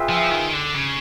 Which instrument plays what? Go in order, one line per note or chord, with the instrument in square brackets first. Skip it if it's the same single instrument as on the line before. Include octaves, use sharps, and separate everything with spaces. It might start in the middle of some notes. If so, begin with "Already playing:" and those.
Already playing: [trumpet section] F4 G#4 B4 E5 G5
[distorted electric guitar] F3
D#3
D3
C#3